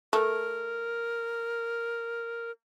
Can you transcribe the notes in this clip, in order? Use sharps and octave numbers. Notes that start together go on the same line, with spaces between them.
A3 A#4